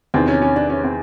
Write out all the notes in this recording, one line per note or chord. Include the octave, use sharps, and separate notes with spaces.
E2 C3 D#3 C4
C#4
C#4
D4
C#4
C4